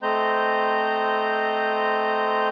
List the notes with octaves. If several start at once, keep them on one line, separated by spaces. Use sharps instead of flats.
A3 C4 C5 D#5 A#5 G6